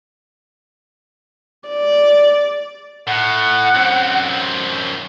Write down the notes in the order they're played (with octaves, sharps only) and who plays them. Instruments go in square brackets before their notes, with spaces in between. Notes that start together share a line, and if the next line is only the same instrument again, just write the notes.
[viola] D5
[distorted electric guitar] A2 [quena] F#5
[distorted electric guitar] F#2 C4